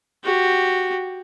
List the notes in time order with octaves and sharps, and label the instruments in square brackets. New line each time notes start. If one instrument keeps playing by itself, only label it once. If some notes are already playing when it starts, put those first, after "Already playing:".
[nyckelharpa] F#4 G4